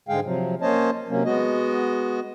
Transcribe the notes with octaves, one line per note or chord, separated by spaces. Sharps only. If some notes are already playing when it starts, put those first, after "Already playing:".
G#2 D3 G#3 G#4 F5 G5
C3 F3 F#3
A#3 C#4 C5 C#5 D#5 A5
C3 F#3 A#3 C#4
G#3 B3 F#4 D#5